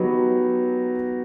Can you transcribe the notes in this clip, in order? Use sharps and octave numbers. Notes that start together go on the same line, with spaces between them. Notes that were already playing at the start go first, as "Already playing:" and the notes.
Already playing: F#3 B3 D#4 G4